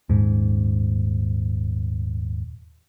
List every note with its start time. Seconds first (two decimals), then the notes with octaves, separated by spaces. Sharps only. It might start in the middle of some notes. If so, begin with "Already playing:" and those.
0.09 D#1 G#2